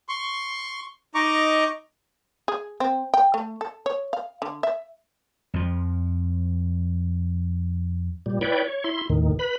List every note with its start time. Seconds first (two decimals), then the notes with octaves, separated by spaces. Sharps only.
0.09 C6 C#6
1.15 D#4 D#5 A#5 C#6 D6
2.48 G#4
2.80 C4
3.14 G5
3.34 A3
3.61 A4
3.86 C#5
4.13 F5
4.42 D3
4.63 E5
5.54 F2 F3
8.26 A#2 G3
8.41 E4 B4 C#5 D5 G5
8.65 C#5
8.84 E4 C6
9.10 D#2 A2 D#3
9.39 B4 B5